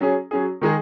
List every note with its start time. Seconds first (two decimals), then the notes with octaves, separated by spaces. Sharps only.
0.01 F#3 C#4 G#4
0.31 F#3 C#4 G#4
0.61 D#3 G#3 D#4 G#4